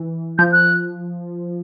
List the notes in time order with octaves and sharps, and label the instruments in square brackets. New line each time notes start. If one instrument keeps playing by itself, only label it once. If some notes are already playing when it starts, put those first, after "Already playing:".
Already playing: [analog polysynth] E3
[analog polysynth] F3 [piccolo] G6
[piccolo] F#6